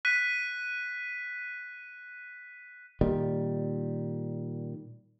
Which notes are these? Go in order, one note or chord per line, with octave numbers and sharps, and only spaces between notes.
F#6 B6 D#7
A#2 D#3 G3